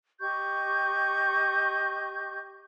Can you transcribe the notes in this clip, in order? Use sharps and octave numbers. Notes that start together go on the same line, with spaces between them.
G4 D#5 C#6 G6